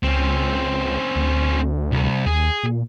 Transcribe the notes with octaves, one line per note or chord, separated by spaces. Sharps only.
C#2 C4 C#4
D2
C2
D#2 G#4
A#2